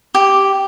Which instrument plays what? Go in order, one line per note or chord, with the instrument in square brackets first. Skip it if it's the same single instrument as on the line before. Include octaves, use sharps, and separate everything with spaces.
[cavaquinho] G4